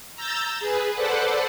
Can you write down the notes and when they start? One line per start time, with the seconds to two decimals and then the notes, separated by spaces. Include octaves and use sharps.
0.16 A#5 E6 G6 A6
0.60 G#4 B4
0.95 A4 B4 C5 D5 F#5